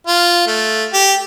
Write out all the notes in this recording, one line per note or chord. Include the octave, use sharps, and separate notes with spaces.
F4
A3
G4